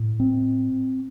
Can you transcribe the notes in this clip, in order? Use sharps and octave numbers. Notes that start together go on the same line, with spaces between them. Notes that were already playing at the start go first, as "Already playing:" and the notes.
Already playing: A2
C4